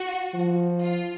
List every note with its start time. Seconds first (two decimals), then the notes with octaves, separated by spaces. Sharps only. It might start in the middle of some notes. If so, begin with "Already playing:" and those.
Already playing: F#4
0.35 F3
0.83 F4